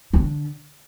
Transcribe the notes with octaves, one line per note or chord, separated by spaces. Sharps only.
D3